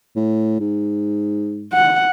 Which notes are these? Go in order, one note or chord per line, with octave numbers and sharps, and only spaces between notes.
A2
G#2
F#5